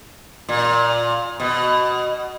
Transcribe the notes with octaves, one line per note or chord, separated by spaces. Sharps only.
A#2
B2